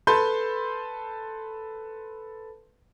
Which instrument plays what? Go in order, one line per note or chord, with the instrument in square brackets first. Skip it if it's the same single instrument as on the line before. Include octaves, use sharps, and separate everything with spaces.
[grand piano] A4 B4 A5 B5 C6 G6